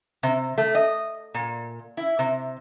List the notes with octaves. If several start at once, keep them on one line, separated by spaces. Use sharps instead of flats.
C3
A3
D#5
A#2
E4
C3